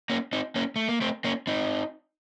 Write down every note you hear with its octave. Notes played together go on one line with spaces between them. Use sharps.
A#3 C#4
C4 D#4
A#3 C#4
A3
A#3
A3 C4
A#3 C#4
C4 D#4